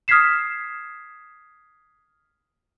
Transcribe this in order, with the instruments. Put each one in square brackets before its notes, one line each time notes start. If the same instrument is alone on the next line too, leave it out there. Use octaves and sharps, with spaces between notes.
[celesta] D#6 F6 G#6 B6 C7 E7